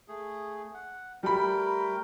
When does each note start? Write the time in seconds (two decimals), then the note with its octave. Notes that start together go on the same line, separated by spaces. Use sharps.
0.08 A3 G#4
0.74 F#5
1.23 G3 A3 A#4 G5 B5